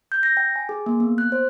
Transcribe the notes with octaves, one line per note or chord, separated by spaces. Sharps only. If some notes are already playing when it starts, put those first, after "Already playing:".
G6
A#6
G5
G#5
G#4
A#3
B3
F#6
C5